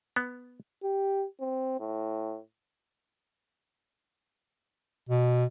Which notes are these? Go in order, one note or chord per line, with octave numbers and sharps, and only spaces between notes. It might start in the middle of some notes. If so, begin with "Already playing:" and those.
B3
G4
C4
A2
B2